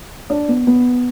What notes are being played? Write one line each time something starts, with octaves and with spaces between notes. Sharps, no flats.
D4
B3
B3